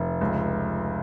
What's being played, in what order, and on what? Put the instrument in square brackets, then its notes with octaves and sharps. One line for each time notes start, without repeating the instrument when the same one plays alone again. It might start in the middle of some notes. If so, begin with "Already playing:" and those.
Already playing: [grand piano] F1
C#2